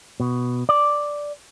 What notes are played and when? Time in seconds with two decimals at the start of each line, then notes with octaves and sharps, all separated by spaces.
0.20 B2
0.69 D5